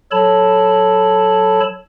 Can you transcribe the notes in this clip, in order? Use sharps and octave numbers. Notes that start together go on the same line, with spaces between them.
F#3 A4 C#5 A5 B5